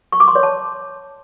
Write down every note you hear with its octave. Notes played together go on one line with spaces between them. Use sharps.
C#6
D6
C6
C#5
A5